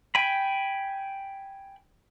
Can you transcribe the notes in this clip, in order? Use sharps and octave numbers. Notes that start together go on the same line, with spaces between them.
G5 G#5 B5